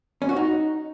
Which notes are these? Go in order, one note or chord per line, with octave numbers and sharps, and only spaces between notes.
C#4
F#4
D#4